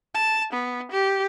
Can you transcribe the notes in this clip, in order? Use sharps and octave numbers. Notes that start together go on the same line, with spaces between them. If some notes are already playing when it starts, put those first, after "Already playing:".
A5
B3
G4